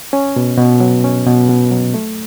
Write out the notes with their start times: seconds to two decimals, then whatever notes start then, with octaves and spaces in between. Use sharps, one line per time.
0.13 C#4
0.36 B2
0.58 B2
0.80 F#3
1.04 C#4
1.27 B2
1.49 B2
1.72 F#3
1.94 A3